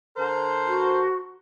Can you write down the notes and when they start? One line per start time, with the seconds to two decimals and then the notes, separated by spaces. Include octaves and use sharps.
0.17 D3 A#4 C5
0.66 F#4